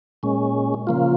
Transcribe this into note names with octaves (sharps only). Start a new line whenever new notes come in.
A#2 G#3 C#4
C#3 F3 A#3 F4